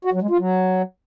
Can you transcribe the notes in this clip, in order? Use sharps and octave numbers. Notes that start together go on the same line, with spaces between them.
F#4
F#3
G#3
F4
F#3